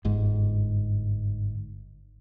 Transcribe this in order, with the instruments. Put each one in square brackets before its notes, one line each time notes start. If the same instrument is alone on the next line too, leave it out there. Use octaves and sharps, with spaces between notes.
[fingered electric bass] G1 G#2